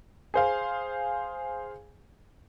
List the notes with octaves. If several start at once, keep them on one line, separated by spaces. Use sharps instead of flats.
G#4 C5 F5